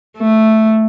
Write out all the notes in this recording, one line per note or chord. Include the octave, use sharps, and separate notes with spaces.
A3